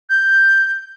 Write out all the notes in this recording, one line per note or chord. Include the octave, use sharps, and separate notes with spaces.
G6